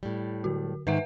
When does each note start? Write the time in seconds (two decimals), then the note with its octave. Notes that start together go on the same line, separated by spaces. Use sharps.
0.03 A2 G3
0.44 D3 F#4
0.87 G#2 D#3 B4 E5 F#5